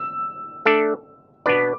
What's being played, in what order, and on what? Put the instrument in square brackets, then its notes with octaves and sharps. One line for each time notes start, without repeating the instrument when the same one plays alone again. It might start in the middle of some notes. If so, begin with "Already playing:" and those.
Already playing: [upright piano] E6
[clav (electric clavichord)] A3 D4 A4 D5
[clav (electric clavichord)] B2 B3 D4 B4 D5 [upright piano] D6